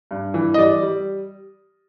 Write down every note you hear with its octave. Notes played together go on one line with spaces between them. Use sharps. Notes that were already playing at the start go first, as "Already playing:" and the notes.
G2
E3
D#5
G3 D5
G3